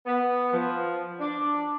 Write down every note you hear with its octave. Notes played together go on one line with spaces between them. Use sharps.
B3
F3
D4